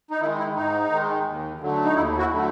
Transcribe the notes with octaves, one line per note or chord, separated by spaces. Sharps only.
D#4
D#3 G#3 E4
E4
G#2 D#4
D#3 G#3
D#2
D3 F#3 A3
D#4
D#2 E4
E4 F#4
D3 F#3 A3